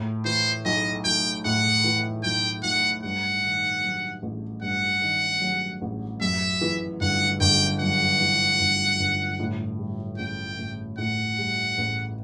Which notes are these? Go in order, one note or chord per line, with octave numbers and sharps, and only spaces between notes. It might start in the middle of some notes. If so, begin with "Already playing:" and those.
Already playing: A2
E3 C5
B1 D#5
B1 G5
A2 F#5
E3
B1 G5
B1 F#5
G2 F#5
D#3
F#3
A1
G2 F#5
D#3
F#3
A1
F#2 E5
E3
G1 F#5
G1 G5
F#2 F#5
E3
G1
G1
A2
G3
A1 G5
A1
A2 F#5
G3
A1